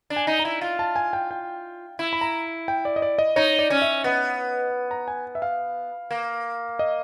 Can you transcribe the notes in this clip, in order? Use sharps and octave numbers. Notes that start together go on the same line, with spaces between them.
D4
G#5
D#4
A#5
E4
F4
A5
G#5
G5
G5
E4
B5
A#5
G5
D5
D#5
D5
D#5
D#4 C#5
D5
C#4
E5
B3 D#5
A#5
G#5
E5
F5
A#3
D#5